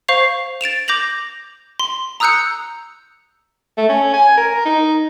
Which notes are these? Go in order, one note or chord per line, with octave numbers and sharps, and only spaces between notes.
C5 F5 C#6 C7 F7
A6 D7 E7 F7
D6 G6 A#6 F7 F#7
C6
A#5 D#6 E6 F#6 G6 C#7
A3
C#4
G#5
A#4
D#4